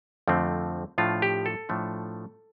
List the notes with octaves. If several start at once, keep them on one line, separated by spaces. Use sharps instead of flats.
F2 D3 F3 A3 C4
A2 F3 A3 D4 F4
G4
A4
A2 F3 A3 D4